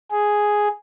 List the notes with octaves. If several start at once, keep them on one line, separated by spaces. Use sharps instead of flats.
G#4